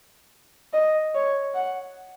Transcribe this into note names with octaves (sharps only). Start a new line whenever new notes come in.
D#5
C#5
F#5